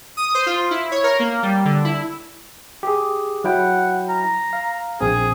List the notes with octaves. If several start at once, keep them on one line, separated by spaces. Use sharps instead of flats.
D#6
C5
F4
E4
C#5
A#4
A#3
G3
D3
E4
G4 G#4
F#3 E4 F#5 G5
A#5
F5
A#1 C4 G#4